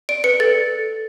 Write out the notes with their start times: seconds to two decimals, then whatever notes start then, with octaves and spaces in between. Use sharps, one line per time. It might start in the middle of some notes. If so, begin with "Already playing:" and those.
0.09 D5 D7
0.24 B4 C#7
0.40 A4 A6